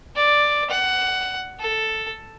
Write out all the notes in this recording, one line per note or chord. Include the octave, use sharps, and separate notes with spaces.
D5
F#5
A4